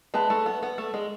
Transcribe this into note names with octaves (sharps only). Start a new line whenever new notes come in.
G#3 B4 E5 A5
A3
B3
B3
A3
G#3